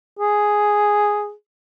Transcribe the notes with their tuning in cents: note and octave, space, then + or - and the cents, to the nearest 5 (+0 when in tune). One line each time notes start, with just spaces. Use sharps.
G#4 +0